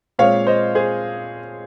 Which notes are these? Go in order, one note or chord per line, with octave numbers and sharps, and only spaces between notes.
A#2 G#3 C4 C#5 F5
C5 D#5
G#4 C5